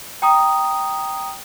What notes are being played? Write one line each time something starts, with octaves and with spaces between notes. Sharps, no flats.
G5 A#5 D#6